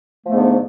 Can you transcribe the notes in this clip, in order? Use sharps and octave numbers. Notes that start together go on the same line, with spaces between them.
G#2 D3 F3 A3 B3